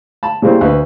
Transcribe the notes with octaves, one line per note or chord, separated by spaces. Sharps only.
A5 B5
C#3 G3 A#3 C4 E4
D2 B4